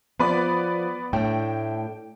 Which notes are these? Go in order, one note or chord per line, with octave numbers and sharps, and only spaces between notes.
F3 B3 B4 D5
A2 A3 D4 G5